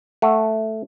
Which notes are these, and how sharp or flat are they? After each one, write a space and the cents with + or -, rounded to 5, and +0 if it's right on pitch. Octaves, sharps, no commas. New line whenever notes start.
A3 +0 F#5 +0